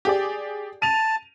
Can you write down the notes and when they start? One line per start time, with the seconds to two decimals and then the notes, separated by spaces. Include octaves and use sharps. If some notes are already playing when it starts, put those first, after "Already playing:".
0.05 G4 G#4 D5
0.82 A5 D#7 F7